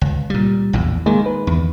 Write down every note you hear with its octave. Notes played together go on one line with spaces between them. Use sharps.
C#2
A#2 G3
A#1 E2 A2
D#3 G#3 A#3
B4
E2